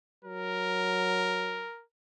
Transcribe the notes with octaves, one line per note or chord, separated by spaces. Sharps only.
F#3 A#4